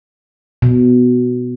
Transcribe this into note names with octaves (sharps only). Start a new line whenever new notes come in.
B2